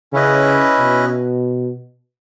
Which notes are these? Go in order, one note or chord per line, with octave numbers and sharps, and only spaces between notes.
C#3 C#4 E4 B4 D#5
B2